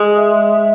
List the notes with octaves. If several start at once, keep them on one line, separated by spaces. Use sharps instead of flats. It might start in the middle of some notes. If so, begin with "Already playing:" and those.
Already playing: G#3
E5